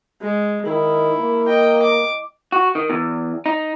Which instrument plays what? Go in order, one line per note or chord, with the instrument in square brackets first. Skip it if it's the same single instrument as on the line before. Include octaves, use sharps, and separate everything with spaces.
[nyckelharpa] G#3
[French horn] D#3 [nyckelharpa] E4
[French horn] A#3
[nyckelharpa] D#5 G5
D6
[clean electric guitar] F#4
D#3
E2
D#4